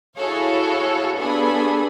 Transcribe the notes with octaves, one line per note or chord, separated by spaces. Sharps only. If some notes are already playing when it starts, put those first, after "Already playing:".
E4 F#4 G#4 A4 C#5 F5
G2 B3 D4 G#4 A4 B5